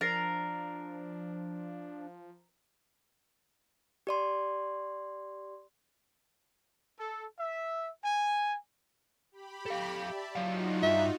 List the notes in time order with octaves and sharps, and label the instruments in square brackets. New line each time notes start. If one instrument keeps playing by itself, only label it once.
[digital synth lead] F3 [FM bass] D4 [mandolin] A#4 [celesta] A6 A#6 C7
[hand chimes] G4 D5 C6
[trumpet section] A4
E5
G#5
[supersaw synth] G4 B5
[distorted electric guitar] A4 F5
[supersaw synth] D5 E5 A5
[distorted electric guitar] F#3 F5 [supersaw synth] D#4 F4 F#4
[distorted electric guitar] G2 [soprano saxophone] E5